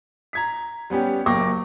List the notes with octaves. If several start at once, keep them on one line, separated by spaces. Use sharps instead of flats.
A#5 G#6 B6
G3 B3 C#4 G4
F#1 A#3 G5 C#6 D6 A#6